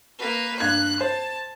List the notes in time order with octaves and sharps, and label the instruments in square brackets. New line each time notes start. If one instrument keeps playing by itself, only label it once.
[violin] A#3 B4
[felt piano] G2 G#6 [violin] F#6
[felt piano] C5 [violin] A5